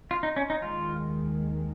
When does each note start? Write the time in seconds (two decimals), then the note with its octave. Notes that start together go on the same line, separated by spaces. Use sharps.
0.11 F4
0.23 D#4
0.36 C#4
0.50 D#4
0.62 D#2 D#3 G#3 F4